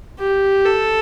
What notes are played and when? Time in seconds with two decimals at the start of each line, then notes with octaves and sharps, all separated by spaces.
0.19 G4
0.65 A4